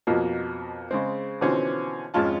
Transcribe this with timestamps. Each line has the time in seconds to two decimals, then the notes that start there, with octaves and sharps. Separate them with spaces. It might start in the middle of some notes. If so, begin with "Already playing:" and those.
0.07 F2 B2 F3 A#3
0.91 C#3 G#3 C4
1.41 B2 D3 E3 F3 C4 C#4
2.14 G#1 F2 G#3 C#4 F4 A5